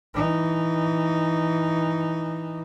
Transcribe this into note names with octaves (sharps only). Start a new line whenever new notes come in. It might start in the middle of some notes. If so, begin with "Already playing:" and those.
E3 D#4